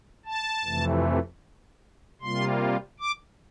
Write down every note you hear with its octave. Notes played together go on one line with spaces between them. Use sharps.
A5
F2 C3 E3 A3
C3 G3 A#3 F4 C6
D6